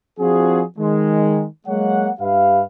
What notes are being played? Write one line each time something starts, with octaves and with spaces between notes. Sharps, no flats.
F3 C4 D4 F4 F#4 G#4
D#3 G#3
F#3 G#3 A#3 C#5 F#5
G2 G4 B4 E5 F5